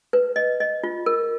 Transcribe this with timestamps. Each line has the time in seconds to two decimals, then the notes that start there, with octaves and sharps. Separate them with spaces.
0.13 B4
0.36 D#5
0.60 D#5
0.84 F4
1.06 A#4